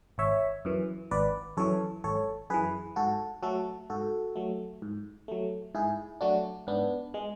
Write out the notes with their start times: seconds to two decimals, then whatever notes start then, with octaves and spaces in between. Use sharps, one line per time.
0.18 G#1 C#5 E5
0.65 F#2 E3
1.11 G#1 B4 D5
1.57 F#2 E3 A4 C#5
2.04 G#1 A4 C#5
2.50 F#2 E3 G#4 B4
2.96 G#2 F#4 A4
3.43 F#3 A3 F#4 A4
3.90 G#2 F#4 A4
4.36 F#3 A3
4.82 G#2
5.28 F#3 A3
5.75 G#2 E4 G#4
6.21 F#3 A3 D4 F#4
6.67 G#2 B3 D4
7.14 G#3